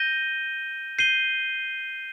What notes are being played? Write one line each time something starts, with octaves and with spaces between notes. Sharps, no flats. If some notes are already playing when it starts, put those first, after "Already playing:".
Already playing: G6 A#6 D#7 G7
G6 C7 D#7 G7